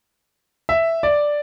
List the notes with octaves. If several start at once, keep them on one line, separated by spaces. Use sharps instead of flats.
E5
D5